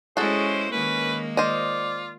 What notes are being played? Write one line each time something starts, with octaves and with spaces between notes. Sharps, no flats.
G#3 C#4 E4 F#4 G#4 A4 C5
D#3 G#3 A#3 C#4 B4
F4 C5 D5 D#5